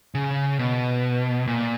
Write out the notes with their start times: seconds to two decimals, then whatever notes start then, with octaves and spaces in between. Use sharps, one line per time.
0.15 C#3
0.59 B2
1.47 A#2